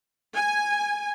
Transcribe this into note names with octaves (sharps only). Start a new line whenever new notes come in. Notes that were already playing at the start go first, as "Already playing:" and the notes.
G#5